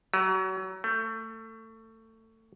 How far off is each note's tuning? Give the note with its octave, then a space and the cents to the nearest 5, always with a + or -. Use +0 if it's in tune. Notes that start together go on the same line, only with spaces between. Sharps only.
F#3 +30
A3 +25